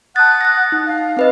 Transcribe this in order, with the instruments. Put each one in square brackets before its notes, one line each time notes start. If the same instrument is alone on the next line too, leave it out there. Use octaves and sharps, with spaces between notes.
[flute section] F#5 D#6 F#6 [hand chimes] A5 A6
[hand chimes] A6 A#6
D#4
[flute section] F5
[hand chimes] C4 B4 D#5